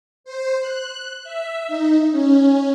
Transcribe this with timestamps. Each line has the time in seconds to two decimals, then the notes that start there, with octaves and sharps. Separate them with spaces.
0.24 C5
0.60 F#6
1.24 E5
1.68 D#4
2.11 C#4